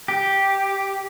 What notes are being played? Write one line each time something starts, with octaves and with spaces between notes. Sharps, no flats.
G4